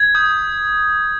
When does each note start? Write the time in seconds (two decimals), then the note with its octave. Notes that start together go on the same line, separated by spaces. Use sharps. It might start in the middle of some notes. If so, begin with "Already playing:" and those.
Already playing: G#6
0.15 D#6 G6